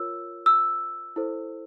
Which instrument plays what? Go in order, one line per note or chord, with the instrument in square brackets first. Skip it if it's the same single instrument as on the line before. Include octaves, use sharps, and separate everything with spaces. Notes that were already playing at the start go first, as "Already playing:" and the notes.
Already playing: [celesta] F4 A#4 C#5 E6
E6
E4 A4 C5